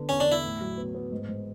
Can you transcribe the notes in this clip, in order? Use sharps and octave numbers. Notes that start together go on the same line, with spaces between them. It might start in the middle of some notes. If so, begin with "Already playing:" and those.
Already playing: D3 B3
E2 C#4
D4
E2
E4
A2
F#3
B3
B3
G#2
G#2